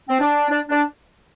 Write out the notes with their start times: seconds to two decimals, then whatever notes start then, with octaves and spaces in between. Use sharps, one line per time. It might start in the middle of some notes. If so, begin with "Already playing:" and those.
0.09 C4
0.20 D4
0.50 D4
0.69 D4